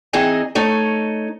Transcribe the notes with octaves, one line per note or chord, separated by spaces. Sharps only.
E3 C4 D#4 G#4 D#5 G#5
A3 D#4 C#5